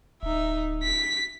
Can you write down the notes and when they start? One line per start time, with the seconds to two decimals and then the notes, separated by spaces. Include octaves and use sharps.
0.23 D1 D#4 E5
0.83 B6